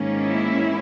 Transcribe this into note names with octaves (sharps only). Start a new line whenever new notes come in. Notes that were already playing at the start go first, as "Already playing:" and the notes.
Already playing: G#2 D#3 A#3 C#4
E4